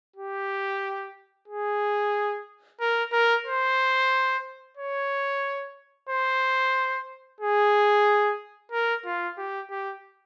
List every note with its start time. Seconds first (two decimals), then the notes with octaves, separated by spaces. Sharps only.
0.16 G4
1.48 G#4
2.81 A#4
3.12 A#4
3.46 C5
4.77 C#5
6.09 C5
7.41 G#4
8.72 A#4
9.05 F4
9.38 G4
9.71 G4